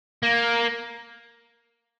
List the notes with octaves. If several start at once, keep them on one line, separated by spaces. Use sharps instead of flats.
A#3